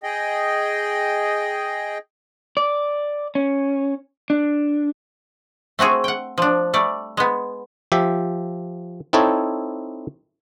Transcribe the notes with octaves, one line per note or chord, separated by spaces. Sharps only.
G#4 D#5 G5
D5
C#4
D4
A3 C4 F#4 G#4
F#5 G5
F3 D4
G3 A3 D5
G#3 B3
F3 G4 E5
C4 D#4 E4 A4 C#5